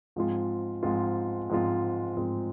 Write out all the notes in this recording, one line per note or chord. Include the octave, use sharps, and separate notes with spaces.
G#2 F3 G#3 C4 F4
G#2 F3 G#3 C4 F4
G#2 F3 G#3 C4 F4
G#2 F3 G#3 C4 F4